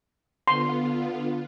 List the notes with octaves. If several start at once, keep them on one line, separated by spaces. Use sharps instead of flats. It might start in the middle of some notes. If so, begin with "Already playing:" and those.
D3 B3 F4 C6